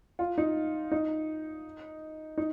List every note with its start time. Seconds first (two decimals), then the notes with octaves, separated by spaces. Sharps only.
0.19 F4
0.38 D#4
0.92 D#4
2.37 D#4